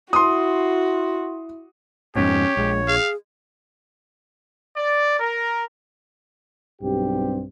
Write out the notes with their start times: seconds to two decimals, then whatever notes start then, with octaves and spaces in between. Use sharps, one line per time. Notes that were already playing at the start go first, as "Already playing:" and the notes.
0.13 E4 F#4 C6 D#6
2.16 F2 G#2 B2 C#4 G4 C#5
2.57 A#1 G#3
2.88 G#4 F5
4.77 D5
5.20 A#4
6.82 B1 G2 C4 G4